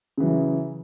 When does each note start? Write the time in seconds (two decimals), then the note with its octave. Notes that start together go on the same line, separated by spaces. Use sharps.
0.17 C#3
0.20 E3
0.23 F#3